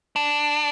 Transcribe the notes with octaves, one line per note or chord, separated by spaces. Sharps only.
D4